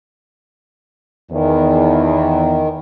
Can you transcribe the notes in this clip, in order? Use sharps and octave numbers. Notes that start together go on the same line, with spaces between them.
E2 D#3